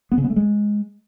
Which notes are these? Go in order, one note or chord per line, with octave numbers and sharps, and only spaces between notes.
B3
C#3
B3
A3
G#3